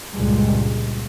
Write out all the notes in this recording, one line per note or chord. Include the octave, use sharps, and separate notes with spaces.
C#2 G2 A#2 G3 G#3